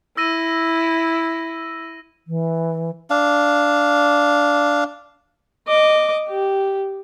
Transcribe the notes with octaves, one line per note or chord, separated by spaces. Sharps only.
E4 E6 A#6 D#7
E3
D4 F5
D#5 D6
G4